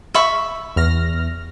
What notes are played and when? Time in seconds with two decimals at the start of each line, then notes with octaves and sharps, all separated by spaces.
0.14 E5 B5 C#6
0.76 E2 F6 A#6